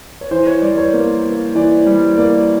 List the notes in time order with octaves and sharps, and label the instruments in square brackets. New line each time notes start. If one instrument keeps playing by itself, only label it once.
[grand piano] C#5
E3 C5
C#5
G3 D5
C#5
A#3
A#3
E3 D5
G3
A#3 D5